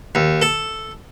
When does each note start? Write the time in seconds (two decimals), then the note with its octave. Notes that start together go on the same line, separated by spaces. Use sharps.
0.15 D#2
0.42 A4